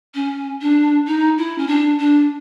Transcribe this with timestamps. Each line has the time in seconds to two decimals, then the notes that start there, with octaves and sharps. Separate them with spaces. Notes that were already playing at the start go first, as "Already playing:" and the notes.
0.14 C#4
0.61 D4
1.07 D#4
1.38 E4
1.58 C#4
1.67 D4
1.99 D4